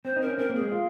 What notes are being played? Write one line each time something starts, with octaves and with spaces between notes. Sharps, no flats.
C4 C5
D#4
A#4
C#4
C4 A#4
A#3
G#4
G#3
F4